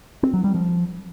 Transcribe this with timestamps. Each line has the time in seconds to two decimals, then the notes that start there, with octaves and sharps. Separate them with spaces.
0.23 C4
0.34 F#3
0.44 G3
0.55 F3